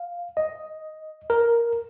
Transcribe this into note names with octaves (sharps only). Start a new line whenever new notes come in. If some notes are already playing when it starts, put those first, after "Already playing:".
Already playing: F5
D#5
A#4